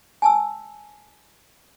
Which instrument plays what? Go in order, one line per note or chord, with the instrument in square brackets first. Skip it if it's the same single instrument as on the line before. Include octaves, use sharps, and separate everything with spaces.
[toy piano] G#5 A5 E6